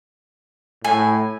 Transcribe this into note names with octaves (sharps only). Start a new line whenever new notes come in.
A2 G#5